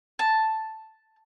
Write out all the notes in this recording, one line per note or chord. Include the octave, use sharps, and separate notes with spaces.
A5